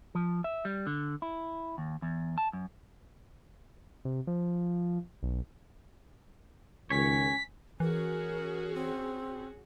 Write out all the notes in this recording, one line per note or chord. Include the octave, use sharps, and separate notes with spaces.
F3
E5
G3
D3
E4
D#2
E2
A5
F#2
C3
F3
B1
C#2 D#3 C#4 C#5 B6
E3 C#4 F#4 G#4 A#4
C4